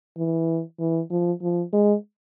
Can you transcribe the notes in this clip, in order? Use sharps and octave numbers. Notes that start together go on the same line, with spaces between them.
E3
E3
F3
F3
G#3